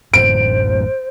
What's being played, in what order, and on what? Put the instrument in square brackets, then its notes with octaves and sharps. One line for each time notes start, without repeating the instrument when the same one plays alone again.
[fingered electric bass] A1 F#2 A2 [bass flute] C5 [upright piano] D7